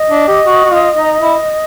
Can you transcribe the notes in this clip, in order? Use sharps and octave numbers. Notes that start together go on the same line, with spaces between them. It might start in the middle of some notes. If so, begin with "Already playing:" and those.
Already playing: D#5
D4
G4
F#4
F#4
F4
D#4
E4